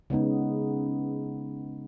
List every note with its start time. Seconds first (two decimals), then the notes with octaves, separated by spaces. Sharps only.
0.10 C#3 G#3 B3 D#4